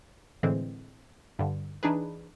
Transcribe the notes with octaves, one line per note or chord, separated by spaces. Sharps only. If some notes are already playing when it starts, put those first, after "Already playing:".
A2 D3 E3 G#3 C4
G2 D3
E3 D4 D#4 G#4 B4